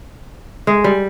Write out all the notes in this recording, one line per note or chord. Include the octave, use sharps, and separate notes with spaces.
G#3
G3